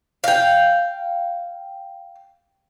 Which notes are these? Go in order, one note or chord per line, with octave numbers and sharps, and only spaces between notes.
F5 G5